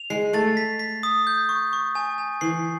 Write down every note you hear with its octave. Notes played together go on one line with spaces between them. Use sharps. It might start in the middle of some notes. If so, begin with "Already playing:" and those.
Already playing: F7
G#3 C7
A3 A6
B6
B6
D#6
G6
C#6
C#6
G#5
G#5
E3 C7